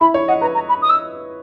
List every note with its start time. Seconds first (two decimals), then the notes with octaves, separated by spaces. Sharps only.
0.01 E4 B5
0.14 C#5
0.28 D#5 F#5
0.41 B4 A#5
0.55 A#5
0.69 B5
0.82 D#6
0.89 E6